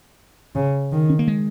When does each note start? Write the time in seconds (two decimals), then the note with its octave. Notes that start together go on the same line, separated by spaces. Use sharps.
0.55 C#3
0.92 D#3
1.10 C#4
1.19 A#3
1.28 G#3